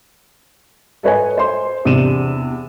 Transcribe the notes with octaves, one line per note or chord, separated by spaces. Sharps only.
A4 B4 C#5 D#5 G#5
C5 C6
E2 C3 D4 D#7 E7